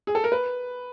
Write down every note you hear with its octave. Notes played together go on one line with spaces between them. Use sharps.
G#4
A4
A#4
B4